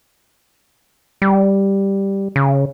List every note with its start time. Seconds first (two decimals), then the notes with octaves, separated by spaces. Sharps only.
1.22 G3
2.36 C#3